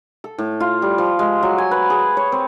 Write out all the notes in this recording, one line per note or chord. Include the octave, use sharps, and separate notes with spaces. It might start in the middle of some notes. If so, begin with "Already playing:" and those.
A4
A2
F4
G3
F3
G#3
F#3
G#5
B4
G#4
C#5
C4